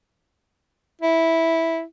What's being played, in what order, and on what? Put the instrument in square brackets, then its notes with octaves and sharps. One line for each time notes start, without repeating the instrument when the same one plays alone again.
[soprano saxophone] E4